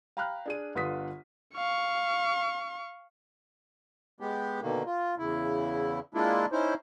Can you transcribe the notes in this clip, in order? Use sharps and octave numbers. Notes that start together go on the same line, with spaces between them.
F5 G5 A#5 B5 F6 F#6
D4 G#4 D#7
G1 D3 F4 B4 D#6 B6
F5 C#6
G#3 B3 G4
B2 D3 D#3 A#3
F4
E2 C#3 E4
G#3 A#3 D4 E4 F4
C#4 D#4 E4 C5